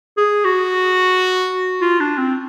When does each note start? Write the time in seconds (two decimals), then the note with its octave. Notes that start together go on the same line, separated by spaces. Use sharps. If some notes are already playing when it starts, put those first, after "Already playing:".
0.17 G#4
0.45 F#4
1.81 F4
2.00 D4
2.18 C4